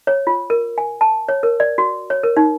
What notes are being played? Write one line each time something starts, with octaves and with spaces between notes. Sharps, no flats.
C#5
F4
A#4
G#5
A5
C#5
A#4
D5
F#4
C#5
A#4
D#4